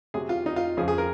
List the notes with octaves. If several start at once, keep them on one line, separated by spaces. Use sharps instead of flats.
C3 F#3 G#4
F4
D#4
F4
F2 C#3 F3 G#4
G#4
A#4